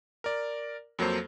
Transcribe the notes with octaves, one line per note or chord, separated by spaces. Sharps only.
A#4 D5
F2 F#3 A#3 A4 C5